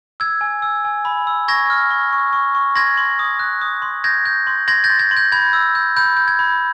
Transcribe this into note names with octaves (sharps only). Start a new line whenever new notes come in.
E6 G#6
G#5
E6
G#5
B5
E6
C#6 G#6 A#6
F6
C#6
C#6
C#6
C#6
C6 G#6 A#6
C6
D#6
F#6
D#6
C6
G6 G#6 A#6
G6
C6
C6 G#6 A#6
G6 A6
C6
G#6
C6
G6
B5 G#6
E6
G6
B5 G6
G6
G#6
B5